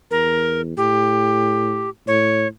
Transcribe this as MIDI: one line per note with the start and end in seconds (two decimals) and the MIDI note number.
0.11 0.75 40
0.11 0.61 70
0.77 1.89 45
0.77 1.89 67
2.07 2.46 45
2.07 2.47 73